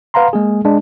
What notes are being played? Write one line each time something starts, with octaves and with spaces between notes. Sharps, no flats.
B4 F5 F#5 A#5 C6
G#3 A#3 G#4
G#3 D4